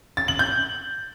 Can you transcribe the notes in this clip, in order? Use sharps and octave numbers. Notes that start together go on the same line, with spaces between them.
A6
F#7
G6